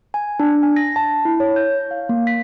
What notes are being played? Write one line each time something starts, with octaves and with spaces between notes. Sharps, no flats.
G#5
D4
G#5
A#6
A5
E4
C#5
G6
F5
A#3
B6